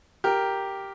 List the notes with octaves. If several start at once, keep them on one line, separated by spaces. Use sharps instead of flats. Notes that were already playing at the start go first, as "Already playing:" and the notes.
G4 A#4